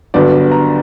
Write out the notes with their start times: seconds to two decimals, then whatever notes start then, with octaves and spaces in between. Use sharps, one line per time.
0.14 G1 G2 F#3 B3 D4 D5
0.52 A#5